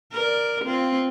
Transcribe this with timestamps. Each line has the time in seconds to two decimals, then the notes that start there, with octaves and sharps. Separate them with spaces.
0.13 A#4 D5
0.65 C4 F4